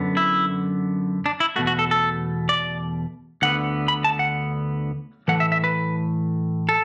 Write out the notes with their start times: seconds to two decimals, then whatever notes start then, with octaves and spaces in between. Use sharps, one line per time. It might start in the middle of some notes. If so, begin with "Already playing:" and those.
Already playing: F#2 D3 B3
0.17 E4
1.26 D4
1.40 E4
1.56 E2 B2 A3 F#4
1.67 F#4
1.79 A4
1.91 A4
2.49 D5
3.42 D2 D3 B3 F#5
3.88 B5
4.04 A5
4.19 F#5
5.28 A2 E3 A3 F#5
5.40 E5
5.52 E5
5.64 B4
6.69 A4